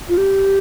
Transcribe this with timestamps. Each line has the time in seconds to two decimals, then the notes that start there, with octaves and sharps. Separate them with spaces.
0.09 F4
0.17 G4